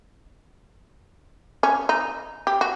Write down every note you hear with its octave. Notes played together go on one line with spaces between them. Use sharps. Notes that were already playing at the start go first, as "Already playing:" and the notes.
C#4
D#4
G4
F#4